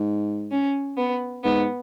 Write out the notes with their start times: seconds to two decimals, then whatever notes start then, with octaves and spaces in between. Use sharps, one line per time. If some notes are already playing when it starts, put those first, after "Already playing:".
Already playing: G#2
0.52 C#4
0.97 B3
1.44 G#2 B3